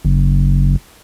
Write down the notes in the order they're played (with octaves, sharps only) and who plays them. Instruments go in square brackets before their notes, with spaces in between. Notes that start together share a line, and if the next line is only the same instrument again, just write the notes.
[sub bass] F#1